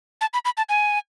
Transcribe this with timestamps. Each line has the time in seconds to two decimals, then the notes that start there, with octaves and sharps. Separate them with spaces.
0.21 A5
0.33 B5
0.45 B5
0.57 A5
0.69 G#5